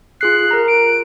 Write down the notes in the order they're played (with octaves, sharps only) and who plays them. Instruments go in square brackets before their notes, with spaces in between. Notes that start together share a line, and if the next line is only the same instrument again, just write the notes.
[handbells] F4 G#4 C7 [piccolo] F#6
[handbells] A#4 A#5
[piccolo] D7